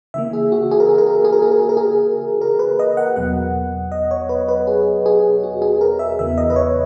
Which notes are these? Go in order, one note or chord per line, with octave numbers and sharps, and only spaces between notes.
C#3 E3 A#3 E5
G#4
F#4
G#4
A#4
G#4
A#4
G#4
A#4
G#4
A#4
G#4
A#4
G#4
A#4
G#4
A#4
B4
D#5
F#5
E2 B2 F#3 B3 F#5
D#5
C#5
B4
B4
G#4
G#4
F#4
G#4
A#4
E5
E2 C#3 E3 B3 E5
D#5
B4
C#5